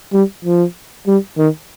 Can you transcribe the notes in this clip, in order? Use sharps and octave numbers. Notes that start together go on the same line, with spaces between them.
G3
F3
G3
D#3